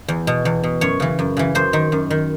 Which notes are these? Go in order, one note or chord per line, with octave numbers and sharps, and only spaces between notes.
E2
B2
E2
B2
F#2 C#5
C#3 E3
F#2
C#3 E3
F#2 C5
D#3
F#2
D#3